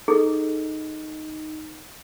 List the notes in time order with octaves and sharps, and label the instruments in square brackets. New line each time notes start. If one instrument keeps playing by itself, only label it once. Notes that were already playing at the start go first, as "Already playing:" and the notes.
[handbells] D#4 [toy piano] G#4 A4